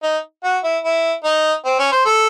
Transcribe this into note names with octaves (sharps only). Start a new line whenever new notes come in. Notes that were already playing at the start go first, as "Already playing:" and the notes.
D#4
F#4
E4
E4
D#4
C4
C#4
C5
A4